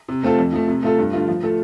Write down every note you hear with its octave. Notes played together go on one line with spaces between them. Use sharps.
C3
A3 C4 F4 A4
F2
F3 A3
C3
A3 F4 A4
G2
D3 A3 F4
F3
A3 F4 A4